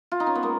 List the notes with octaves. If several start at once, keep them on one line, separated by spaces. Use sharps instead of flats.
F4
D#4
C#4
B3
G#3 A#3